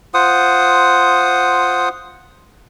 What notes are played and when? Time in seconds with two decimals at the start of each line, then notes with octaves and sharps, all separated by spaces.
0.14 F4 C5 F#5 D#6